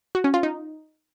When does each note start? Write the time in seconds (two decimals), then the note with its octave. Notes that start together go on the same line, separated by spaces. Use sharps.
0.15 F#4
0.24 C#4
0.34 F4
0.43 D#4